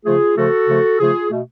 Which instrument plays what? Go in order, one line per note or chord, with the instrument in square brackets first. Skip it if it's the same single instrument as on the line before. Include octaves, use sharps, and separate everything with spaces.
[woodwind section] C#3 F3 A3 F4 G#4
C#3 F3 A3 F#4 A4
C#3 F3 A3
C#3 F3 A3 F4 G#4
B2 A3